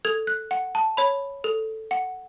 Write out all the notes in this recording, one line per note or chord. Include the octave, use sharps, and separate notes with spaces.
A4 G#6
F#6
F#5
A5
C#5 B5
A4
F#5